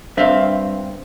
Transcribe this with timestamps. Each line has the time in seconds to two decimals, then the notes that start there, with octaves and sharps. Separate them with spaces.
0.18 G2 C4 D4 E5 F5